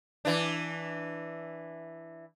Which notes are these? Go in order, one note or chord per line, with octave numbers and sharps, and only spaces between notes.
E3 D4